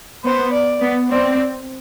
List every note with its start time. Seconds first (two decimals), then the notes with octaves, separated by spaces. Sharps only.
0.25 B3 C5
0.53 D5
0.81 B3
1.09 C4 D5